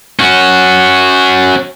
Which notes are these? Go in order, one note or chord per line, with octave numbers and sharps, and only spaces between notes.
C#4 F#4